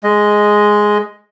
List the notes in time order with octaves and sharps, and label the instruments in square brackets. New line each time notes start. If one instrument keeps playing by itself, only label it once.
[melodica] G#3 D#5